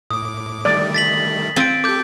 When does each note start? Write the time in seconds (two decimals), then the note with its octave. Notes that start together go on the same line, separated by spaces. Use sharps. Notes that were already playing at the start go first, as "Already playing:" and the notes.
0.11 A2 D6 D#6
0.65 D#3 G3 A3 D5
0.94 A6 B6 F#7
1.56 C4 F4 A6 D7
1.84 G4 A4 D6 G6